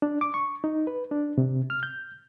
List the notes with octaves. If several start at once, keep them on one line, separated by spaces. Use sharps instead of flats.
D4
D6
C#6
D#4
B4
D4
C3
F6
G6